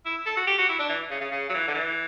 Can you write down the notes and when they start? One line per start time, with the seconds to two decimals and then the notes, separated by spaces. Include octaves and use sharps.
0.06 E4
0.26 A4
0.37 F#4
0.47 G4
0.59 F#4
0.69 E4
0.79 D4
0.89 E3
1.11 C#3
1.21 C#3
1.32 C#3
1.49 F#3
1.54 E3
1.67 D3
1.75 E3